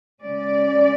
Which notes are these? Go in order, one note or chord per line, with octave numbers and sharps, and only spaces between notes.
C#3 G#3 C#4 D5